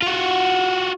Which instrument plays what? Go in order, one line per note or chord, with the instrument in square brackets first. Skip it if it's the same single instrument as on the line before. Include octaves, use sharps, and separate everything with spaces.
[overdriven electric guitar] F4 F#4